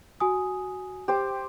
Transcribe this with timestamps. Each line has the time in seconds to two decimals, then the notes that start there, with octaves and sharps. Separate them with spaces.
0.20 F#4 G#5 D#6
1.08 G4 C5